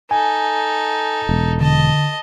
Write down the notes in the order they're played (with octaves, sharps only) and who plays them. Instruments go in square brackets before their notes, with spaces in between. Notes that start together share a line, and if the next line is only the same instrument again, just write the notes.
[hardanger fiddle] D#4 A4 [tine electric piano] G#5
[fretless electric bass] E1
[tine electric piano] D3 [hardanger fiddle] D#5 A5